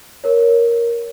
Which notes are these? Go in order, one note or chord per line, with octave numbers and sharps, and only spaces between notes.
A#4 C#5